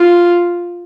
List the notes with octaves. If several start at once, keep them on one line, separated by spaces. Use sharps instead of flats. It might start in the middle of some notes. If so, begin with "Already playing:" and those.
Already playing: F4